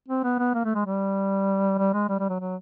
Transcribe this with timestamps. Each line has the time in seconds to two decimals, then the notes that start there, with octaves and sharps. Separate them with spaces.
0.08 C4
0.23 B3
0.39 B3
0.54 A#3
0.65 A3
0.75 G#3
0.85 G3
1.78 G3
1.93 G#3
2.09 G3
2.19 G3
2.29 F#3
2.40 F#3